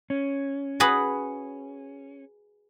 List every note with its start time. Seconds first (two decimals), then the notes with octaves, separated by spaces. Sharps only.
0.10 C#4
0.80 F#4 G#4 B4